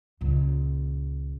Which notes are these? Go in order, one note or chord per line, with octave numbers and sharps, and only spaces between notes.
C#2 A#2